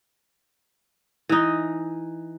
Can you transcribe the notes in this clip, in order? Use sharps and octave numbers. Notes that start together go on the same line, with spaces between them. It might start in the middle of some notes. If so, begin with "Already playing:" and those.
E3 D#4